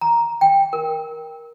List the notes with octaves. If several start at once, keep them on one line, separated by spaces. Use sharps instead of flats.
A#5
G5
A#4